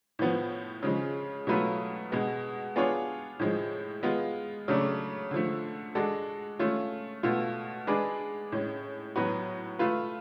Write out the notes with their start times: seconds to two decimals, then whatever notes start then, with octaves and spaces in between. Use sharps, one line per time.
0.19 A2 F3 B3
0.83 C#3 F3 G#3 C#4
1.47 B2 F#3 A3 F4 B4
2.12 B2 G#3 B3
2.76 B3 D4 F4 G#4 C#5
3.39 A2 F3 G#3
4.03 G#3 B3 F4
4.68 C#3 F#3 A3 D4
5.31 D3 F3 A3
5.95 G#3 D4 F#4 A4
6.59 A3 C#4 F4
7.23 B2 A3 F4
7.87 G#3 D4 G#4 B4 D5
8.52 A2 G#3 C#4
9.16 A2 F#3 B3 F#4 B4
9.79 A3 F4 B4 F5